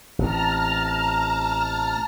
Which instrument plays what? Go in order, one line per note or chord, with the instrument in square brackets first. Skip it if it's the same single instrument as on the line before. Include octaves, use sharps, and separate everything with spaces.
[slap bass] A1 C3 [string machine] A5 A#5 F6